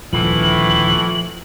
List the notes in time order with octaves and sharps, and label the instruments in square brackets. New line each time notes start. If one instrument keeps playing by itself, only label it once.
[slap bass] D#1 D2 [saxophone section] A2 E3 [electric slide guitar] F3 [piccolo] F#7